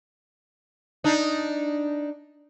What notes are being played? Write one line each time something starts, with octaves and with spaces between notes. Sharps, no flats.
D4 D#4